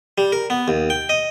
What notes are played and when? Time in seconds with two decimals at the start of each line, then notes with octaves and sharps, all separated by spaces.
0.18 G3
0.32 A#4
0.50 B3
0.68 D#2
0.90 G5
1.09 D#5